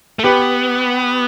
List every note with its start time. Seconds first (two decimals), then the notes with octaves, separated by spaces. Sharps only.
0.19 A3
0.24 B3 G4 B4